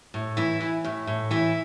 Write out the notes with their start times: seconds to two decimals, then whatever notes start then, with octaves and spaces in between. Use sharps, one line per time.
0.14 A2
0.37 E3 E4
0.60 E3
0.84 A2
1.07 A2
1.31 E3 E4